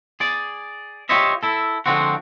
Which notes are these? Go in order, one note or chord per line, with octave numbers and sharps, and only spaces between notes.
G#4 D5
F4 G4 C5 C#5 D#5 E5
E4 A4
D3 F3 G#3 C4 F#4